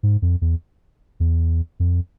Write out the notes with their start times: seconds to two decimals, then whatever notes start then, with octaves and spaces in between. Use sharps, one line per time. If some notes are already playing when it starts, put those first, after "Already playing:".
0.03 G#2
0.22 F2
0.41 E2
1.20 E2
1.80 F2